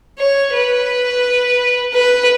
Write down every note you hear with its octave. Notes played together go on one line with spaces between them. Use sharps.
C#5
B4
B4